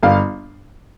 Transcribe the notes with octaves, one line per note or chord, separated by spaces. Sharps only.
G1 F5